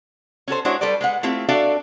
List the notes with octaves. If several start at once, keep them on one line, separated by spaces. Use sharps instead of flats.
C#4 F#4 A4 C5
G#3 D4 E4 F#4 C5 C#5
G3 A4 B4 C5 D5
G#3 B4 F#5
A3 C4 E4 F4 G4
D4 F#4 A4 D5 E5 F5